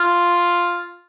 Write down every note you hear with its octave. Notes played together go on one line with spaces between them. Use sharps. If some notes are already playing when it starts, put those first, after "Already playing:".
Already playing: F4